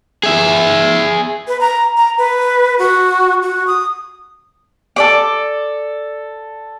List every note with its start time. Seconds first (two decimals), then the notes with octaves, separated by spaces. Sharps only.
0.23 G#4 E5
1.48 B4
1.61 A#5
1.97 A#5
2.18 B4
2.79 F#4
3.42 F#4
3.67 D#6
4.96 A4 D5 D6